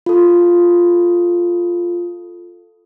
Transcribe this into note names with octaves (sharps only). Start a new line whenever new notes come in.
F4 A4